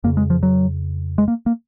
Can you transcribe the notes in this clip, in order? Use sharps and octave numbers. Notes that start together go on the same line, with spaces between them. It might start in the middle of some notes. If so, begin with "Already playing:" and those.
F2 C#3 A#3
G#3
F3
F#3
G#3
A#3
A#3